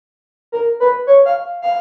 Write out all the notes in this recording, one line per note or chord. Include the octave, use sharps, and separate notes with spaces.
A#4
B4
C#5
F5
F5